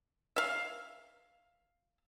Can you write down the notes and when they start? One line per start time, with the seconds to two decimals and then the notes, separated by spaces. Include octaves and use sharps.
0.36 E5 F5